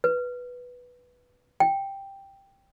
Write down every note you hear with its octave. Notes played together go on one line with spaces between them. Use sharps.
B4
G5